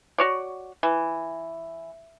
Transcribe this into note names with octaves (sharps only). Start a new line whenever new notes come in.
F#4 C#5 D5
E3